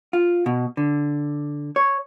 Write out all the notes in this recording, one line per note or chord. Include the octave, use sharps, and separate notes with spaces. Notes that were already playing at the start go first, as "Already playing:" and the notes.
F4
B2
D3
C#5